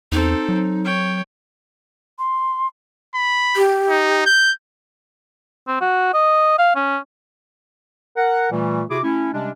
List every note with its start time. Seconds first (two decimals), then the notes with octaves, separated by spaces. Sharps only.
0.12 E2 C4 D#4 A4
0.49 F#3
0.84 C#5 G5
2.18 C6
3.15 B5
3.56 G4
3.90 D#4
4.26 G6
5.68 C4
5.81 F#4
6.14 D#5
6.58 F5
6.76 C#4
8.17 A#4 F#5
8.51 A#2 E3 G3 A3
8.90 C3 E4 F#4 G#4 D6
9.03 A3 C#4 E4
9.33 C3 G3 G#3 C#4 D4